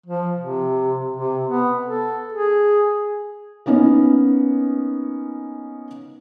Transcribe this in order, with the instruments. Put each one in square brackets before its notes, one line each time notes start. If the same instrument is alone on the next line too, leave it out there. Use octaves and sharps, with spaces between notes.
[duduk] F3
C3
C3
B3
A4
G#4
[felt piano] A#3 B3 C#4 D#4